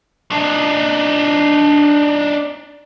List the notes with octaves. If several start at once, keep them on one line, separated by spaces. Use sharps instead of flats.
D4 D#4